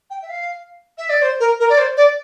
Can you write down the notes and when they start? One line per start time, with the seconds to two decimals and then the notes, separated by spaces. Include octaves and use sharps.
0.10 G5
0.22 E5
0.29 F5
0.97 E5
1.09 D5
1.22 C5
1.39 A#4
1.59 A#4
1.69 D5
1.77 C5
1.96 D5